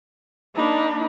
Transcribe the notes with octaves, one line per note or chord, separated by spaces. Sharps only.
A#3 D4 D#4 B5